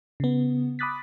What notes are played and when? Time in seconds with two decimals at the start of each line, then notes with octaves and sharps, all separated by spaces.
0.20 C#3 B3
0.79 B5 D6 D#6 F#6 A6 B6